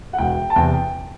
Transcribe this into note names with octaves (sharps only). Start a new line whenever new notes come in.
F#5
E1 G5
A5
E2 C3 G5